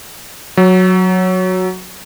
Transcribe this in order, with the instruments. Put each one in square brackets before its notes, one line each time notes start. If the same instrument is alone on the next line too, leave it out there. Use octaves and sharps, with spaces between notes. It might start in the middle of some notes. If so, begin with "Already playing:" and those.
[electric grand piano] F#3